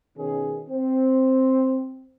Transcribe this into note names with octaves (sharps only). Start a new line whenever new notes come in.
B2 D#3 C#4 G#4
C4